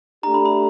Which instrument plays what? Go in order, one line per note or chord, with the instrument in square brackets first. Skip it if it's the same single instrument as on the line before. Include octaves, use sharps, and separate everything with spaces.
[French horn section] A3 D4 G4 [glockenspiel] A#5
[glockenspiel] B5
B5